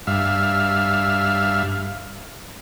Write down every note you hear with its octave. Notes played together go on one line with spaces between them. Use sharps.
G2 E5 F5